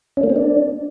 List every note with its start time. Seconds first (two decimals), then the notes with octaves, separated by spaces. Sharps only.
0.17 C#4
0.23 A#3
0.30 C4
0.36 D4